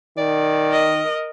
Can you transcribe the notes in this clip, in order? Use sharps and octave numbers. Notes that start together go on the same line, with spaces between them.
D#3 D5
A#4 D#5